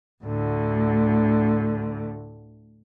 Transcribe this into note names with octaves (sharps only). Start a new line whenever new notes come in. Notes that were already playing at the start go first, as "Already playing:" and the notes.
D2 A2 D3